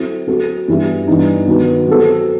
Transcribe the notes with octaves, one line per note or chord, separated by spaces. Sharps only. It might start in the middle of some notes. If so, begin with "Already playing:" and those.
Already playing: F#3 C4 E4 A4
F#3 C4 F#4 A4
G2 E3 B3 E4 G4
G2 E3 B3 D#4
D#3 F#3 B3
F#3 C4 F#4 A4